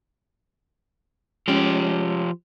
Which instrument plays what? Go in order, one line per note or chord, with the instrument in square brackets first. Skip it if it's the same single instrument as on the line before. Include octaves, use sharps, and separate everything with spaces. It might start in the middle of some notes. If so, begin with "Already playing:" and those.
[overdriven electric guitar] F3 G4 [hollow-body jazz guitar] G#3 C#4